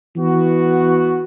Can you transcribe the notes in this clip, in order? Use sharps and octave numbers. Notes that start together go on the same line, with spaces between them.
E3 B3 F#4